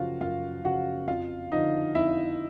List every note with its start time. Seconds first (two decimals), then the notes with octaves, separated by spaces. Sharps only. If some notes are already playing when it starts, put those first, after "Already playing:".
Already playing: F#2 C#3 F3 F4 F#4 F5
0.21 F#2 F4 F5
0.64 C#3 F3 F#4 F#5
1.07 F2 F4 F5
1.52 D3 F3 D#4 D#5
1.95 F2 E4 E5